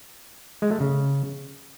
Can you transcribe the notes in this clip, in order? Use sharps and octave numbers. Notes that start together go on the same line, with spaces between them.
G#3
A3
C#3